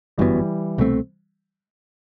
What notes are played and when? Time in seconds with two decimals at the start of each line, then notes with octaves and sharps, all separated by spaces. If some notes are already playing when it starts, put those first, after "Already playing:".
0.18 G1 F#2 E3 F#3 G3 B3
0.78 C2 B2 A3 C4